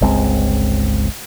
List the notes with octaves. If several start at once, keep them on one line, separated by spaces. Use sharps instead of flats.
G1 C#2 G#3 C4